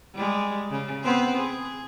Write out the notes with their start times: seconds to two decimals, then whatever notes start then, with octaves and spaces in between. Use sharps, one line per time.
0.15 G3 G#3
0.71 C#3
1.03 B3 C4 C5
1.37 G#4